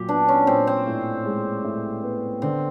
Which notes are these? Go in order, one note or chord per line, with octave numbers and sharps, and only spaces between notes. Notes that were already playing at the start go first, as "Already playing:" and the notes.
Already playing: A#2 F#3 G4
B3 D4
C#4
A#2 C4
C4
A2
G#3
A2
B3
D3 C4